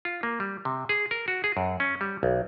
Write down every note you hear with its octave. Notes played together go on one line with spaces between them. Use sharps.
F4
A#3
G3
C3
G#4
A#4
F#4
G#4
F#2
C#4
G3
B1